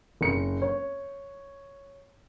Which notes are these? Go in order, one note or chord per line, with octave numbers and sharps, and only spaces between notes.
F#1 C#7
C#5